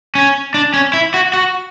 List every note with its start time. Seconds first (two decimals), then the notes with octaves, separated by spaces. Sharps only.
0.15 C#4
0.54 D4
0.74 C#4
0.93 E4
1.14 F#4
1.33 F#4